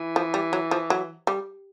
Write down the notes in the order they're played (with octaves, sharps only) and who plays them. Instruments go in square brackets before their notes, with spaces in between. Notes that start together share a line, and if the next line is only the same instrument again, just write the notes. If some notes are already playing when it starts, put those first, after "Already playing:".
Already playing: [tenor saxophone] E3
[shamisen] F3
G3
F#3
F3
F#3
G3